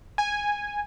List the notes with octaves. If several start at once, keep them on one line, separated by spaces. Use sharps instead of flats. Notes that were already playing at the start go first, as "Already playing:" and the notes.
G#5